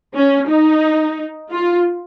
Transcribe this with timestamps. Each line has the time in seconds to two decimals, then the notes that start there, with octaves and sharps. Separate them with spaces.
0.15 C#4
0.48 D#4
1.51 F4